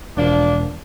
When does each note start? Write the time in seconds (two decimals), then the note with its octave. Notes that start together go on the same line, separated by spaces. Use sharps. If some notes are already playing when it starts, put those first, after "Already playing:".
0.17 E1 F3 A#3 D4